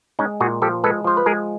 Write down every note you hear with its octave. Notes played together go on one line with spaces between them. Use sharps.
G#3 C#4 D#4
A#2 F#4 G#4
F3 G4 A4
G#3 A4 B4
F3 C5
B4
G#3 G#4 A#4